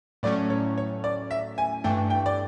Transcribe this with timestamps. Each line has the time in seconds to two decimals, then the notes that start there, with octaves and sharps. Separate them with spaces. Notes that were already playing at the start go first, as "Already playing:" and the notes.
0.23 A2 F#3 A3 C#4 D5
0.50 C#5
0.78 C#5
1.04 D5
1.31 E5
1.58 G#5
1.84 G2 E3 A3 D4 G5
2.10 G5
2.26 D5